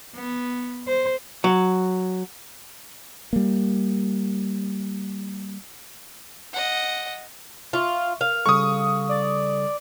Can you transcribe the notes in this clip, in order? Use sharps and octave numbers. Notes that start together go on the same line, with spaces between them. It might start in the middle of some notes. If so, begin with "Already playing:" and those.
B3
C5
F#3
G3 A#3
D#5 F#5
F4 E5 C6 C#6
A#4 F5
C#3 G3 A4 C#6 D#6
D5